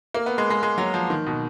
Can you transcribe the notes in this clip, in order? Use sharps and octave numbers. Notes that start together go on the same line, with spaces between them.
A#3
B3
G#3
G#3
G#3
F#3
F3
D#3
B2